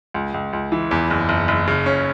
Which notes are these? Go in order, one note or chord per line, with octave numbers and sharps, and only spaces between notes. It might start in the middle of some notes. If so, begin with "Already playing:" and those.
C#2
C#2
C#2
E3
E2
F#1
F#1
F#1
C#3
C#4